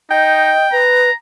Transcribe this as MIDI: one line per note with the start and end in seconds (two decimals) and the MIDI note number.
0.11 0.53 63
0.11 0.70 75
0.11 0.80 79
0.72 1.10 71
0.72 1.13 82